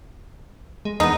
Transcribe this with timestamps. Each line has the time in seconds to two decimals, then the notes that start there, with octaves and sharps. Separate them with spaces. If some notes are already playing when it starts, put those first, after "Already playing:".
0.85 G#3
1.00 E2 B3 D#4